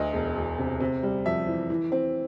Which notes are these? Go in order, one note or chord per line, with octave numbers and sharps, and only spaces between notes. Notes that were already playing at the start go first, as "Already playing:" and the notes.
Already playing: D2 D#5
E1
E1
C3
C3
G3
F2 E5
E3
E3
C4